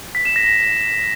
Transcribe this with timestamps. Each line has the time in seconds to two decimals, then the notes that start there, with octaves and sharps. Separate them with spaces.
0.15 B6
0.25 E7
0.36 A#6